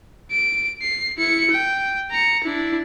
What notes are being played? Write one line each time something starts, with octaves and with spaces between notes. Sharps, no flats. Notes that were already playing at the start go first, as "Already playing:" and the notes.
D7
C7
E4 C#7
G5
A#5 C#7
D4 E4